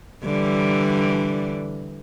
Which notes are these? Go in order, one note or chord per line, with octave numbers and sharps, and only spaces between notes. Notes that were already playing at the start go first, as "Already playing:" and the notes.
D3 E3 G3